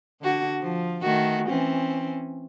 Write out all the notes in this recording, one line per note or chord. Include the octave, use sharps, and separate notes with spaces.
D3 F#4
F3
D#3 A3 F#4
E3 C4 C#4